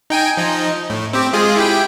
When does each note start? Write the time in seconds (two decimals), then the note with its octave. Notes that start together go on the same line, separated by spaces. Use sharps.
0.10 D#4 G5 G#5
0.37 F3 D#4
0.90 A2
1.13 C4 G4
1.33 G#3 F4 G#4
1.56 E4 G4 G5